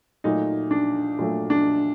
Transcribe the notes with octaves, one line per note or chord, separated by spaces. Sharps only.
A#2 F#3 A3 D#4
D4
A#2 F#3 A3
D4